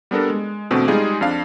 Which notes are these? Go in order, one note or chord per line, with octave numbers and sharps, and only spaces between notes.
G3 B3 D4 A4 A#4
G#3
E2 B2 D3 A3 C4
G3 G#3 D#4 F4 G#4
F2 D4 F5